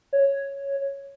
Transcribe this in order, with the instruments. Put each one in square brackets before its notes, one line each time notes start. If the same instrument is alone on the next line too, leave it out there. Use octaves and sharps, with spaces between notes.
[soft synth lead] C#5